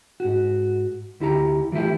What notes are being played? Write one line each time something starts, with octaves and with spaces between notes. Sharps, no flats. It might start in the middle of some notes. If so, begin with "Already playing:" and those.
G#2 F#4
D2 E4 G4 A#5
E3 F3 A3 E4 G4